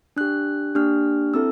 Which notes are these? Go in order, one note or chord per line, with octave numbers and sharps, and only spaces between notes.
D4 G4 F#6
A#3 D4 G4 F6
C4 E4 A4 E6